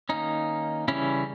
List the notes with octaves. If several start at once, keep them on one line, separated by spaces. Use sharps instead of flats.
D#3 A#3 C#4 D#4
C#3 E3 G3 C#4 E4